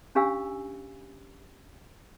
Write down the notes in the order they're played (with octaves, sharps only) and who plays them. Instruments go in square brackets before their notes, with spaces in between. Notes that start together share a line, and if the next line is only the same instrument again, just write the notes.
[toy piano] C#4 D4 G4 F5 G#5 E6